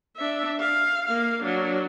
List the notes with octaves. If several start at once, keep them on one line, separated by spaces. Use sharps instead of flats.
D4 E5
F5
A#3 F5
F#3 D4